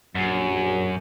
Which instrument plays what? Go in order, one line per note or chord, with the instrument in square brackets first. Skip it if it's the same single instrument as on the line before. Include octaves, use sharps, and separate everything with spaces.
[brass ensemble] A#1 F#3 [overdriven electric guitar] F#2